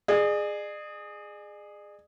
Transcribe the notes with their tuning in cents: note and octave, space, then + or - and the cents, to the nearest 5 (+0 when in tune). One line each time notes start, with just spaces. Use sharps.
G#4 +0 D5 +45